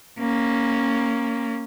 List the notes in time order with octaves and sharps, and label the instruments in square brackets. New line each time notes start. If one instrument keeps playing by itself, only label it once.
[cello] A#3 C#4